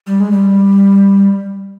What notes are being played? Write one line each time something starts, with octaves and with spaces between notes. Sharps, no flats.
G3
G#3
G3